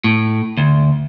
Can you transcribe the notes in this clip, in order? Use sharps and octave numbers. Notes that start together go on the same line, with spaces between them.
A2
D2